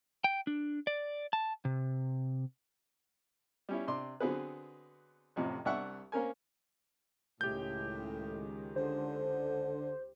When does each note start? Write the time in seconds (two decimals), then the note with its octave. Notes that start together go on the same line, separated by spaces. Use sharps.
0.24 G5
0.47 D4
0.87 D5
1.33 A5
1.65 C3
3.69 G3 C#4 E4
3.87 C3 D4 C6 D6
4.20 D3 F#3 B3 C4 G#4 B4
5.36 A1 F2 A2 C3
5.65 C2 D4 E5 F#5 C#6
6.12 A#3 C4 C#4 A#4 G#5
7.41 C#2 A2 D#3 G#3 G4 G6
8.76 D3 C5